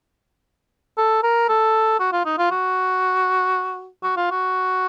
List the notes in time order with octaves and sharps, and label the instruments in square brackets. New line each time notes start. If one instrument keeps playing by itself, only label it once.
[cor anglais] A4
A#4
A4
F#4
F4
D#4
F4
F#4
F#4
F4
F#4